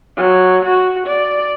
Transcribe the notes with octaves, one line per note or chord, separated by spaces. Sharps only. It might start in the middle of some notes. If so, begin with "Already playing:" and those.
F#3
F#4
D5